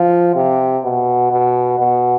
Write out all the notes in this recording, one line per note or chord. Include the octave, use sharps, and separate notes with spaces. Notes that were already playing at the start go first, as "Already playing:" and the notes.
Already playing: F3
C3
B2
B2
B2